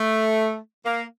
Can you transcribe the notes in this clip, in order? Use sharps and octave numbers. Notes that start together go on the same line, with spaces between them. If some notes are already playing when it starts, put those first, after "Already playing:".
Already playing: A3
A#3